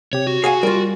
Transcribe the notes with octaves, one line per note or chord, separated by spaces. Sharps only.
C3 G4 C#5
F#4
G#4 F5 F#5 G#5
G3 F4 A#4